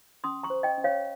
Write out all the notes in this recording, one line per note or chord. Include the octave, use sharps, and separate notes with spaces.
C#4 C6 D#6
A#5 C#6
C5
D#5 G5
C#4
C#5 F5